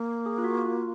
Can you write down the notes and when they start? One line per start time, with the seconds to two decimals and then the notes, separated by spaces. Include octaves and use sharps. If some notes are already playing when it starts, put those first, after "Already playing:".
Already playing: A#3
0.26 G#4
0.38 F4
0.44 F#4
0.65 F4